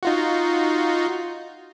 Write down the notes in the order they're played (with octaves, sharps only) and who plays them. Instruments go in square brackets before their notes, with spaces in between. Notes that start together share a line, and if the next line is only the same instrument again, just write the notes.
[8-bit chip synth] D#4 F4 F#4